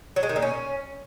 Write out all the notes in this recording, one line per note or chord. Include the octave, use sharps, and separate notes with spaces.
F#3
G#3
D#3
A#2
C#4